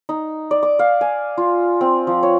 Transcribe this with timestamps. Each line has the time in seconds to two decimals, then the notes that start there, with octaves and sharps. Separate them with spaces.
0.09 D#4
0.51 D5
0.63 D6
0.79 F5
1.01 G#5
1.38 F4
1.81 C4
2.07 F3
2.23 C#5